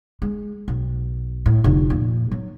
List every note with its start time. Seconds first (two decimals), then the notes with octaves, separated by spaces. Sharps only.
0.22 G#3
0.68 B1
1.46 A2
1.64 F1 D2
1.90 F2 A#2
2.31 F#3 B3